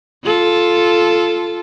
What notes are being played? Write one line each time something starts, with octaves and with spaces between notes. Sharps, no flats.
F4 A4